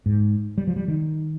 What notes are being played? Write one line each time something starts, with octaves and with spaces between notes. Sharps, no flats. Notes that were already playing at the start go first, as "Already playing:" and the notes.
G#2
G3
F3
G3
D#3